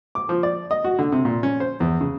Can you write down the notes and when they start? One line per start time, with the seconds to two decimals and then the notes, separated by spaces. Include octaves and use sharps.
0.15 D6
0.29 F3
0.43 D5
0.71 D#5
0.85 F#4
0.99 D3
1.12 C3
1.25 A#2
1.43 C#4
1.60 C5
1.80 E2
2.01 C#3